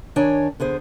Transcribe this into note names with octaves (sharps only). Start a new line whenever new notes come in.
D#3 D4 C#5 G#5
D3 B3 G#4 C5